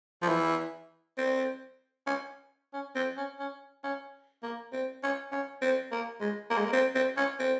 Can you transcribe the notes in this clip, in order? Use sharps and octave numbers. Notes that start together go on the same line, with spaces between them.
F3
E3
C4
C#4
C#4
C4
C#4
C#4
C#4
A#3
C4
C#4
C#4
C4
A#3
G#3
A#3
G#3
A#3
C4
C4
C#4
C4